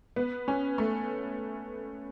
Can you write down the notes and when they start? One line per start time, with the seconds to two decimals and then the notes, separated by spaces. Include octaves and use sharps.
0.16 B3
0.48 C#4
0.78 A3